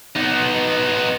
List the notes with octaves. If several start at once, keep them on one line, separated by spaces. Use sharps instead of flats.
B3 D#4